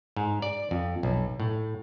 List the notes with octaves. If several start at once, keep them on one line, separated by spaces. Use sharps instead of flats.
G#2
D5
F2
B1
A2